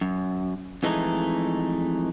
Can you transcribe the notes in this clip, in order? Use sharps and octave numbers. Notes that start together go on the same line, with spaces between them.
F#2
F2 E3 G#3 A3 D#4